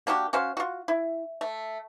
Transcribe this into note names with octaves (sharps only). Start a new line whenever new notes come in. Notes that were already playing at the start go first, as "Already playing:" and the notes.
A#3 D4 F#4 G4
C#4 F#4 C5 F5
F4 F#4
E4
A3